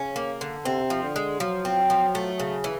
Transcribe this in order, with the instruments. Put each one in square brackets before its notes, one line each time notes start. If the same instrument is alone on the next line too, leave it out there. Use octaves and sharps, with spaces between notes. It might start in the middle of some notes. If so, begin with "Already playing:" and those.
Already playing: [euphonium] C#3 [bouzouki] C#4
[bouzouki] A#3
D3
[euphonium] C3 [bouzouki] C4
[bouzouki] F3
[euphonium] D3
[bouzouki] G#3
[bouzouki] F3 [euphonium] F#3
[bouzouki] C4
F3
A3
C#3
E3